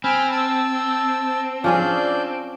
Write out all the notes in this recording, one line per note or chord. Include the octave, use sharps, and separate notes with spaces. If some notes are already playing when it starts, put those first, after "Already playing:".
C4 G#5 B5 F6
A5 E6
F3 C#4 D4 G#4 D5 G6